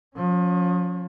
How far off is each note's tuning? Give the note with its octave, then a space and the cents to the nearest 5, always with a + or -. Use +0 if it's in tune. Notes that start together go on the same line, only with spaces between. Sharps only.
F3 +35 C#4 +0